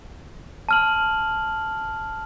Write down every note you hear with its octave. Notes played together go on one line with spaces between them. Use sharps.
A5 F6 F#7